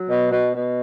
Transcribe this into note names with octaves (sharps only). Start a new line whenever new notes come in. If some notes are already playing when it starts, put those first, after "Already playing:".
Already playing: F#3
B2
B2
B2